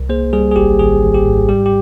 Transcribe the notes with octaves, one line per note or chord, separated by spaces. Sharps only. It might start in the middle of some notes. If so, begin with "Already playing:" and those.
Already playing: C2
A#3 G#4 C5
G3 G#4
G#4
G#1 G4
G#1 G#4
G#1
G4
G#2
G3 G4
G4